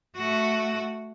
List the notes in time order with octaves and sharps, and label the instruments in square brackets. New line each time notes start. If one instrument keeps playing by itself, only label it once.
[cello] A3 F#4